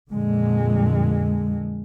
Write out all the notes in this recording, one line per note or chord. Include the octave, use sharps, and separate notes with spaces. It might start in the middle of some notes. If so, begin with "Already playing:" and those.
F2 A#2 D3 G#3